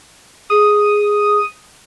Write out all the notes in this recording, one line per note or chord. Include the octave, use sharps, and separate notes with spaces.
G#4 D#6